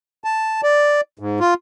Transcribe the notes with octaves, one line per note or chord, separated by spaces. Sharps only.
A5
D5
G#2
F4